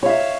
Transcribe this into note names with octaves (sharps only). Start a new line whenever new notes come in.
C#5 E5 F5